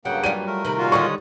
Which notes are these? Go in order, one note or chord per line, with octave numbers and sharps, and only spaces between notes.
G2 C#3 F#3 A#3 F#5 G5
F#3 G3 F4 D#7
A3 A#4
C3 D#3 B5
A#2 F4 F#4
D3 D#3 G3 G#3 C#5 C#6 D#6